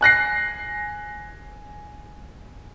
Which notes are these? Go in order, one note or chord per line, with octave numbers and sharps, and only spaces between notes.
G#5 F#6 A#6 C7